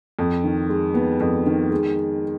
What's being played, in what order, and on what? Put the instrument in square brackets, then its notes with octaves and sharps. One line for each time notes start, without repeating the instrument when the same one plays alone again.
[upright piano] F2
D#3
G#3
B3
F2
D#3
G#3